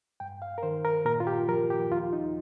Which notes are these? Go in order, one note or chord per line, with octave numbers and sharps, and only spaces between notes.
G2 G5
F5
A#4
D#3 C5
A#4
A#2 A#4
F4
G4
F3 A#4
G4
D#2 F4
D#4